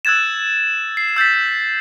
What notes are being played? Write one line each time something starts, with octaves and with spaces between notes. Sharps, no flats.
E6 F#6 G#6 A6 E7
C7
E6 G6 A6 B6